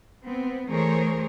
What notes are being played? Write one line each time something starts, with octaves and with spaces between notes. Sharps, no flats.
B3 C4
E3 A3 G#4 A#4 C5 C#5